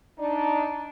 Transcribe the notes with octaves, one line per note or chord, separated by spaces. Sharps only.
D4 D#4